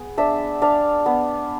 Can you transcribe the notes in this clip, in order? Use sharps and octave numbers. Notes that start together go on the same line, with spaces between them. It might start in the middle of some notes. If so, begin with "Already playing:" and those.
Already playing: B3 G#4
D4 E5
D4 F5
B3